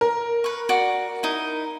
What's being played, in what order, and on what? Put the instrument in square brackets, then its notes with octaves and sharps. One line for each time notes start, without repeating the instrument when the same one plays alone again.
[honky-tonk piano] A#4
[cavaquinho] B4 C#6
F#4 D5
D#4 E4